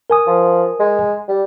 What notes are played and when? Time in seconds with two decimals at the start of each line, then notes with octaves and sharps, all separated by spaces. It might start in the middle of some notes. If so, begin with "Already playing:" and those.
0.10 A#4 G#5 D#6
0.27 F3
0.80 G#3
1.29 G3